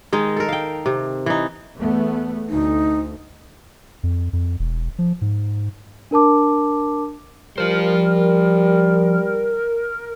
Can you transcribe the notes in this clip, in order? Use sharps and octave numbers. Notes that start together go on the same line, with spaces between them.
D#3 G#3 D#4
A4 A#4
F5 G5
C3
E3 D#4
E2 A3 B3
D2 D#4
F2
F2
E1
F3
G#2
D4 A#4 A5 D6
F3 G3 A#4 C5